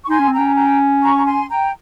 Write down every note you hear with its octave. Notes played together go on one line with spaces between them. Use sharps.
C#6
D#4 G#5 C6
C#4
C4 G5 A#5
C#4
G5 A#5
A#5 C#6
A#5
G#5 C6
G5 A#5